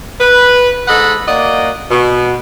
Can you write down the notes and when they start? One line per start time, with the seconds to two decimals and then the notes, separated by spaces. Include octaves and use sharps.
0.20 B4
0.88 G#2 A4 D#5 F#5 B5
1.27 A#3 F#4 D5 D#5
1.90 B2